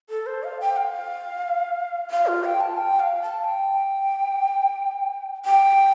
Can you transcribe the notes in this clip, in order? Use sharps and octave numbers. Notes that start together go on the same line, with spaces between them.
A4
C5
F5
G5
F5
F5
F4
G5
A5
G5
F5
A5
G5
G5